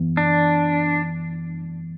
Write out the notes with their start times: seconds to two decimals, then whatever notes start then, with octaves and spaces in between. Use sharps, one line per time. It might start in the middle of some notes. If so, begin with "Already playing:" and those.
Already playing: F#2 E3 B3
0.17 D4